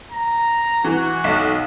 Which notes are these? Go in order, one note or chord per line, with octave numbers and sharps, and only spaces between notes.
A#5
E3 F#4
B1